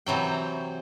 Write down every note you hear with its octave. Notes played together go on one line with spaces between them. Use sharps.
C3 E3 F#3 G5